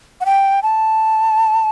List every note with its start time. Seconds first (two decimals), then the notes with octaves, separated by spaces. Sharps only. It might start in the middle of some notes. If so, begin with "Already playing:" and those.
0.21 F#5
0.25 G5
0.63 A5